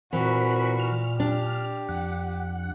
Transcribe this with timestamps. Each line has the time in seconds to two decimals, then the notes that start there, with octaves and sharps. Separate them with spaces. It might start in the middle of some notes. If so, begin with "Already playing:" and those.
0.13 A#2 E3 C4 F#4 A#4 B5
0.80 F6
1.20 D4 G4
1.89 F2 F#5